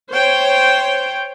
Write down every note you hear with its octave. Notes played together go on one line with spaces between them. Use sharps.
C5 C#5 G5